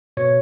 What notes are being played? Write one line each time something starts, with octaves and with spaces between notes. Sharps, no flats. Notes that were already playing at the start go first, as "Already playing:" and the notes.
B2 C#5